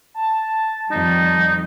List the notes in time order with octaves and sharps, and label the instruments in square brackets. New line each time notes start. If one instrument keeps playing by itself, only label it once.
[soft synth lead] A5
[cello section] F2 D#3 G3 [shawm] D#4